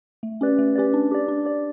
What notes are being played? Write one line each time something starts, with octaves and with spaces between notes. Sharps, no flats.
A3
C#4 G4 B4 D5
A3
C#4 G4 B4 D5
D4
G4 D5
D4
G4 D5